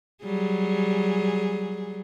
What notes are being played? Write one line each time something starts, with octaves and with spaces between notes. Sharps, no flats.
F#3 G3 G#4